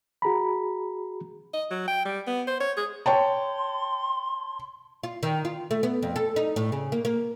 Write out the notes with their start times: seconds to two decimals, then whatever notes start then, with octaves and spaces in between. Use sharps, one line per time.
0.22 F#4 G#4 A#5 B5
1.54 D#5
1.71 F#3
1.88 G5
2.05 G3
2.27 B3
2.47 C5
2.61 C#5
2.77 G#4
3.06 C#5 G5 A5 C6
5.04 F4
5.23 D#3
5.45 F4
5.71 A3
5.83 B3
6.03 F2
6.16 A4
6.36 D#4
6.56 A2
6.72 C#3
6.92 A#3
7.05 A#3